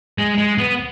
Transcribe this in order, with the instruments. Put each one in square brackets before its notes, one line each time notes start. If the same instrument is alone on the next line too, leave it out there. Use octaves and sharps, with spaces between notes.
[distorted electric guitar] G#3
G#3
B3